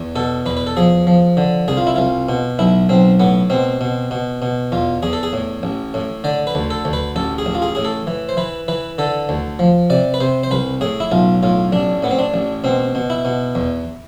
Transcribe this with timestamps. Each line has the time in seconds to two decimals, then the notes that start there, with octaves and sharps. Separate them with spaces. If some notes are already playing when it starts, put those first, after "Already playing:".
Already playing: E2
0.16 B2 A4
0.46 E2 B4
0.57 B4
0.67 A4
0.77 F3 G#4
1.07 F3
1.37 D3
1.68 C2 G#4
1.77 F4
1.87 E4
1.96 C2 F4
2.29 B2
2.59 B1 E4
2.89 B1 C4
3.20 A2 B3
3.50 B2 C4
3.81 B2
4.11 B2
4.42 B2
4.72 E2 F4
5.03 E2 G#4
5.13 A4
5.23 G#4
5.33 A2
5.63 A1
5.94 A2
6.24 D3 D5
6.47 B4
6.55 D2
6.70 A4
6.85 D2
6.93 B4
7.16 A1 A4
7.38 G#4
7.46 A1
7.55 F4
7.62 G#4
7.75 A2 G#4
7.85 A4
8.07 E3
8.29 C5
8.37 E3 B4
8.68 E3 B4
8.98 D3 A4
9.29 D2
9.59 F3
9.90 C3 D5
10.14 B4
10.20 C3 C5
10.43 C5
10.51 C2 B4
10.81 A2 G#4
11.00 E4
11.11 B1 F4
11.43 A2 F4
11.72 A1 D4
12.03 A2 B3
12.11 C4
12.19 D4
12.34 A1
12.64 B2 C4
12.95 B2
13.10 E4
13.25 B2
13.55 E2